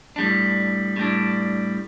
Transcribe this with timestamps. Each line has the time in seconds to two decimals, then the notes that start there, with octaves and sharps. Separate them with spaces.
0.16 A2 G3 D4
0.96 A2 G3 D4